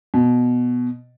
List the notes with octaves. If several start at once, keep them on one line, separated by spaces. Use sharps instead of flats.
B2